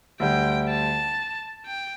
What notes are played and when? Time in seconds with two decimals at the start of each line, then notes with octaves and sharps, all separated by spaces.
0.20 D2 D3 G3 G5
0.69 A5
1.66 G5